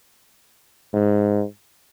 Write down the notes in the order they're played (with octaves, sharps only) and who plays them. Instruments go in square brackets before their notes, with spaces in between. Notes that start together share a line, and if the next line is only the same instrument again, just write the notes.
[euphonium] G#2